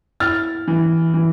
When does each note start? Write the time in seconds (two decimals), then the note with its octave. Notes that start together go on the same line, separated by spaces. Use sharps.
0.20 E4 F6 A6
0.68 E3
1.14 E3